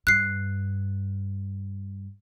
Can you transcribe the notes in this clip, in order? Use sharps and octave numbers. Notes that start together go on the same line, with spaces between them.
G2 F#6 C7